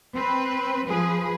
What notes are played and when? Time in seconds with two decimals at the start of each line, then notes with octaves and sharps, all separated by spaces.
0.15 C4 B4
0.87 F3 G#4 B4